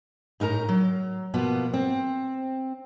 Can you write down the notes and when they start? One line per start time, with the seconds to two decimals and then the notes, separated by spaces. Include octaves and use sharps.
0.40 A2 D#4 A#4 A5 A#5
0.69 F#3
1.34 B2 F3 A#3 B3
1.74 C4